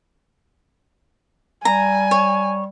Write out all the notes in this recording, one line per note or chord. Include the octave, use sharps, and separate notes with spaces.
G3 G#5 A#5
C#5